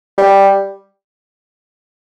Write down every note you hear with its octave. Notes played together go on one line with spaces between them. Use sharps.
G3